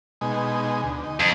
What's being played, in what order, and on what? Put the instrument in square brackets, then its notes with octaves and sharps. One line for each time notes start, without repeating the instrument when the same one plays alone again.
[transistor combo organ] B2 G#3 D#4
D2
D#4
[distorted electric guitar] F2 [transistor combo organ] A4 D#6 E6